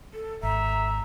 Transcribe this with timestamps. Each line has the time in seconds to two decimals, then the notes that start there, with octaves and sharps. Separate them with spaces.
0.14 A4
0.43 G#1 E5 A#5